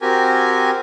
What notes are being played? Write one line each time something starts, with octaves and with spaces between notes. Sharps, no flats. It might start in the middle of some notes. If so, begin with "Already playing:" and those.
C4 F#4 G4 A#4 G#5